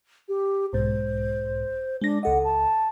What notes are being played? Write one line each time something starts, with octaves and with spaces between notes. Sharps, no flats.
G4
B1 G#2 C5
G#3 D4 A#6
C#2 A4 D#5 F#5
A5